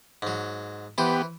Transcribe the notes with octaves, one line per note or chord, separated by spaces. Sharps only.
G#2 F#3
E3 B3 G4 C5